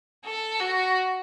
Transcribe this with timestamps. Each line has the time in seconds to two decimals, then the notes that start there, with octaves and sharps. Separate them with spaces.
0.25 A4
0.60 F#4